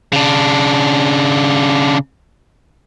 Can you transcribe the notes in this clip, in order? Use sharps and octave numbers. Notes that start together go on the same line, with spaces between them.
C#3 D4